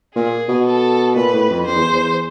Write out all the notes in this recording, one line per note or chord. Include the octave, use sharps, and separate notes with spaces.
A#2 G#4
B2
A4
A#2 B4
A2
F2
F2 C5
E2
E2